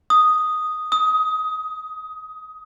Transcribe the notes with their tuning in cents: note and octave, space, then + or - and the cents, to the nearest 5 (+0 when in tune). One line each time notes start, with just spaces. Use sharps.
D#6 +0
D#6 +20